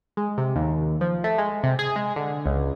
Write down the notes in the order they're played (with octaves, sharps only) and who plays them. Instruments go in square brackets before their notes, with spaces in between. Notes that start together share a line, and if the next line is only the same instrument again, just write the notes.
[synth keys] G#3
C3
D#2
F3
A3
G#3
C3
G#4
G#3
D3
C#2